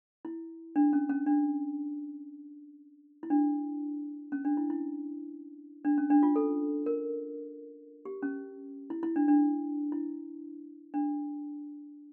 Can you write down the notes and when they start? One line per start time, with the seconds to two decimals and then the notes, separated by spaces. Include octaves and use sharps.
0.25 E4
0.76 D4
0.93 C#4
1.09 C#4
1.26 D4
3.23 E4
3.30 D4
4.32 C#4
4.45 D4
4.57 E4
4.70 E4
5.85 D4
5.98 C#4
6.10 D4
6.23 F4
6.36 A4
6.86 A#4
8.05 G4
8.22 C#4
8.90 E4
9.03 E4
9.16 D4
9.28 D4
9.92 E4
10.94 D4